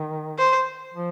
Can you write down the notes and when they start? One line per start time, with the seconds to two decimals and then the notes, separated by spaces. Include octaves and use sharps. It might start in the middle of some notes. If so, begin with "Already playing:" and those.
Already playing: D#3
0.38 C5
0.94 F3